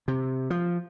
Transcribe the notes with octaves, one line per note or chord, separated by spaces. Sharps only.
C3
F3